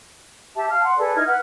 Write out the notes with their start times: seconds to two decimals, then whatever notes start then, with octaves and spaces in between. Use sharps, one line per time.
0.55 G4 E5 A5
0.69 F5 A5 F6
0.83 F#5 C6
0.98 G#4 A4 B4 D5
1.15 D#4 E4 F6 G#6
1.27 B4 F#5 F6